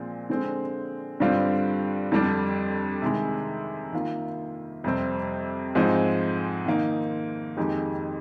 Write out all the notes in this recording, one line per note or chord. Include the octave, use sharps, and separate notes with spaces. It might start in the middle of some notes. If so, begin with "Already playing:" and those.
Already playing: A#2 F3 G#3 C4
D3 G#3 C4
G2 D3 G3 C4 F4
F2 D3 G3 D4
C3 D#3 G#3
D#3 A#3 F4
F2 C3 G3 C4
G#2 F3 G#3 C4 D#4
D#3 A#3 D#4
F2 D#3 G#3 D#4 G4